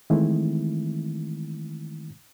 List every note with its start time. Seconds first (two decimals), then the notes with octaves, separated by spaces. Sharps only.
0.10 D#3 E3 G#3 A3 C4 E4